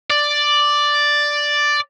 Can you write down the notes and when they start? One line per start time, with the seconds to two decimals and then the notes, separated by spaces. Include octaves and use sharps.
0.10 D5